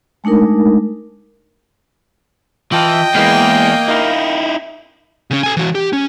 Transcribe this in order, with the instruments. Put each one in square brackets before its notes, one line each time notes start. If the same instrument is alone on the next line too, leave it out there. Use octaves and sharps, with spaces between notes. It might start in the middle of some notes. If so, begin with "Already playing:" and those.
[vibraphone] G#3 A3 D4 D#4 A#4
[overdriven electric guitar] E3 [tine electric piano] F4 A5 F6 [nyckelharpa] D#5 G5
[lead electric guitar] E2 [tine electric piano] E3 G#3 G6 [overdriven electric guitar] A#3
[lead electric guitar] D#4 E4 [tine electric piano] A#4 F5
[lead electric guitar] C#3 C#4
A4 G#5
E3 F#4
G4
C#4